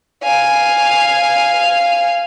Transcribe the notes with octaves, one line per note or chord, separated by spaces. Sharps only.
F5 G#5